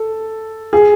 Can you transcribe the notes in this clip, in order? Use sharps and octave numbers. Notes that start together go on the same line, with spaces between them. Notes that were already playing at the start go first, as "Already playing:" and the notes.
Already playing: A4
G#4